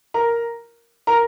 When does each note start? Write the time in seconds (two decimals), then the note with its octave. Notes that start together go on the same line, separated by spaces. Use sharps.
0.14 A#4 A#5
1.07 A#4 A#5